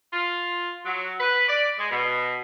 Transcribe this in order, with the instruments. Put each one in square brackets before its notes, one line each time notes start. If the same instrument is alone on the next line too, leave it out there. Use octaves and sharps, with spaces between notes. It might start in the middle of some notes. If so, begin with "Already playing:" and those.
[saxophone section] F4
F#3
B4
D5
G#3
B2